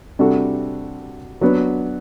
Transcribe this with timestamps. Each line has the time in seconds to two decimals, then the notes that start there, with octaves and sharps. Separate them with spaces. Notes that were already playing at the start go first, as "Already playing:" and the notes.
0.19 C3 G3 D4 F#4 A4
1.41 F#3 B3 D4